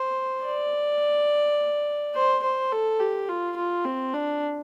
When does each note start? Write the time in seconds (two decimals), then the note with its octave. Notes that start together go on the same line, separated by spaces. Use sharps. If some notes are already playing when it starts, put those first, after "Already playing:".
Already playing: C5
0.44 D5
2.15 C5
2.43 C5
2.72 A4
3.00 G4
3.29 F4
3.56 F4
3.85 C4
4.13 D4